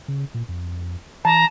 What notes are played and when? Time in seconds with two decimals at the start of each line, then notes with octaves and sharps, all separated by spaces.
0.08 C#3
0.34 A#2
0.48 F2
1.25 E3 A5 A#5